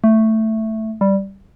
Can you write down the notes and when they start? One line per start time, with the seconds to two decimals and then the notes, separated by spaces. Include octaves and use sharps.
0.04 A3
1.01 G3